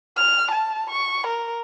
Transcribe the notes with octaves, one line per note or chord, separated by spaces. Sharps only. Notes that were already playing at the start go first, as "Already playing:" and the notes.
F6
A5
C#6
A#4